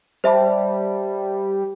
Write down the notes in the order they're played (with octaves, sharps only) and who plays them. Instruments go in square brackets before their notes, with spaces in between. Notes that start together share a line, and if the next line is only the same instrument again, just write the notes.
[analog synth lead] G3 [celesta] C5 E5 A5